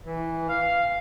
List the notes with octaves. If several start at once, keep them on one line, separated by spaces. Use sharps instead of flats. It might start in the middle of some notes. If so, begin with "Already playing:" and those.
E3
F5